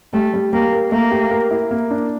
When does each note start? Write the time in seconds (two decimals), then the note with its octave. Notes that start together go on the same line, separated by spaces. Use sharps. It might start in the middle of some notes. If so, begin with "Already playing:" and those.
0.13 G3 A3
0.34 G3
0.53 G3 A#3
0.72 A#4
0.91 A3 A#3
1.11 G4
1.31 A#4
1.51 E4
1.71 A#3
1.91 D4